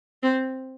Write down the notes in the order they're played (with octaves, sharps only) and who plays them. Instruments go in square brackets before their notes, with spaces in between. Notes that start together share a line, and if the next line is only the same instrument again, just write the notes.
[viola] C4